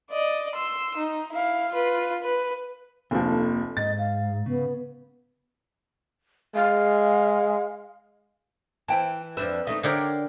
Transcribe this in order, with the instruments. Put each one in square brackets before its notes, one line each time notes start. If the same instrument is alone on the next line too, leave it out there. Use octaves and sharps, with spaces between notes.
[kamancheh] D5 D#5
C6 E6
D#4
E4 F5
F4 B4
B4
[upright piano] F1 D2 F3 [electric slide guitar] A#3 A4
[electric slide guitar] G#2 [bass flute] D#5 [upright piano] A6
[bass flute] F5
[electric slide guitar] C#3 [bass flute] B3
[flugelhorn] G#3 [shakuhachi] F5
[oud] E3 [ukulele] E4 G5 A5
[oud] F2 D4 E5 [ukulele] B4 C5
[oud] C#3 A3 D#4 [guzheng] D#5 [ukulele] E5
[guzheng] D3 G4 A#4 [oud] C#5 D5 F5